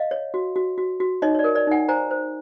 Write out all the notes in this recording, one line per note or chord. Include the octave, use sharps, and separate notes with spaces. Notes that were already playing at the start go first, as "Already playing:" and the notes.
Already playing: D#5 F5
C#5
F#4
F#4
F#4
F#4
D#4 C#5 D#5
C#5
D5
A#4
D5
D#4 F#5 G#5
C5 G#5 A#5
C5